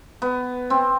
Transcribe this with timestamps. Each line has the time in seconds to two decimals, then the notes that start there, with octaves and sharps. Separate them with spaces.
0.22 B3
0.70 C4